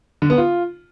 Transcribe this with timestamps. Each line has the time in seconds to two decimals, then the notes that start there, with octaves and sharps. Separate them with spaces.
0.22 D3
0.30 B3
0.38 F4